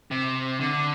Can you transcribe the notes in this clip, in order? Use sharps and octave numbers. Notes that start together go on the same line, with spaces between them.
C3
D3